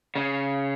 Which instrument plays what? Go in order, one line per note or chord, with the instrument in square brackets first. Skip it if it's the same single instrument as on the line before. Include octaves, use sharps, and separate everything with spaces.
[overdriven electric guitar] C#3